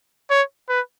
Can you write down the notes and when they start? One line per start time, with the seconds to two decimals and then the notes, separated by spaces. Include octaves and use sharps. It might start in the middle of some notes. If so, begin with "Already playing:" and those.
0.31 C#5
0.69 B4